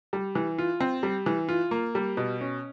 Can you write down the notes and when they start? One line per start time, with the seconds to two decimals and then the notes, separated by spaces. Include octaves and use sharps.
0.13 G3
0.35 E3
0.59 F4
0.81 C4
1.03 G3
1.26 E3
1.49 F4
1.71 A#3
1.95 G3
2.17 B2
2.41 C#4